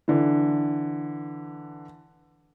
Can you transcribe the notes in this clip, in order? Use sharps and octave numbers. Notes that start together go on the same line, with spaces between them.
D3 E3